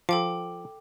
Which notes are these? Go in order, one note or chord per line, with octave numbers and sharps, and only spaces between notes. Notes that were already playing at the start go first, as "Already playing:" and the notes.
F3 A4 G5 D6